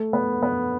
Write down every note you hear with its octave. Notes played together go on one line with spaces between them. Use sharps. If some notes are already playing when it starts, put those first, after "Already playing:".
Already playing: A3
B3
B3